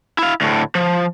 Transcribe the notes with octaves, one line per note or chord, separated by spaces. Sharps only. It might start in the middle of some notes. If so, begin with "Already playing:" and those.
E4 F5
D2 A2
F3